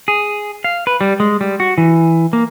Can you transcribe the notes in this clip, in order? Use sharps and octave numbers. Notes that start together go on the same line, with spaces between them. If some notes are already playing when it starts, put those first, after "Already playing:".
G#4
F5
B4
G3
G#3
G3
F#4
E3
A#3